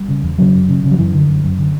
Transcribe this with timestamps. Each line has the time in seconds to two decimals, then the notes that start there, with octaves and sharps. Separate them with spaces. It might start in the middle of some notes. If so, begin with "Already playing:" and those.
Already playing: G3
0.08 C#3
0.23 E2
0.38 C#3 F#3
0.53 F#2
0.69 C#3
0.84 C#3
0.91 F#3
0.98 F#2 E3
1.14 D3
1.28 F#2
1.44 F#2
1.58 D3